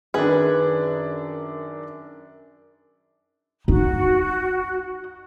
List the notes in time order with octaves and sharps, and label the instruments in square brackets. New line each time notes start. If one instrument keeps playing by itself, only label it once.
[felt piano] F#2 D#3 D4 [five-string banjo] G#4 B4
[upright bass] D#4 [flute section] F#4